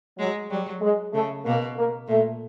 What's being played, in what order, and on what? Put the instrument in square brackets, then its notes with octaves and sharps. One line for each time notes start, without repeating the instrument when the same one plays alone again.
[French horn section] F#3 [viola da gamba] G#3
[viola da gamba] F#3 [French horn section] G3
[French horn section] G#3
[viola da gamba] C#3 [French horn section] A3
[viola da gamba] B2 [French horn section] A#3
[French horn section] A#3
[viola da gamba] A#2 [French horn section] A3